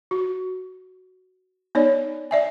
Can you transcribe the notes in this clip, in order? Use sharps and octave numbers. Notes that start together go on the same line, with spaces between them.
F#4
B3 D#4 C#5 D5
D5 E5 G#5